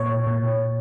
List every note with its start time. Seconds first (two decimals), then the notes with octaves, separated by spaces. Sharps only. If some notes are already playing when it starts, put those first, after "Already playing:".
Already playing: A#2 C#5
0.27 A#2